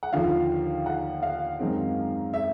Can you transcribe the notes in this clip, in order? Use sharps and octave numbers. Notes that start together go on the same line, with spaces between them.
F#5
D#2 D3 F3 F5
F#5
F5
F#2 D#3 G#3 C4
E5